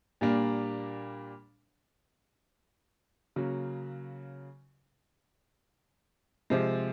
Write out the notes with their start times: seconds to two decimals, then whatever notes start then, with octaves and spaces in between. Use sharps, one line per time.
0.21 A#2 G3 A#3 D4
3.36 C#3 F#3 A#3
6.50 C3 F3 G#3